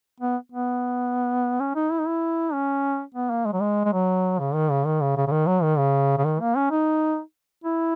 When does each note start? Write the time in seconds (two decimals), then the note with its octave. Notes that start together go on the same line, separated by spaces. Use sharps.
0.20 B3
0.52 B3
1.60 C#4
1.75 D#4
1.91 E4
1.99 D#4
2.07 E4
2.53 C#4
3.14 B3
3.30 A#3
3.45 G#3
3.53 F#3
3.60 G#3
3.85 G#3
3.93 F#3
4.39 C#3
4.54 D#3
4.70 C#3
4.85 D#3
5.01 C#3
5.17 C#3
5.27 C#3
5.31 D#3
5.47 F#3
5.63 D#3
5.78 C#3
6.18 C#3
6.24 D#3
6.40 A#3
6.56 C#4
6.71 D#4
7.64 E4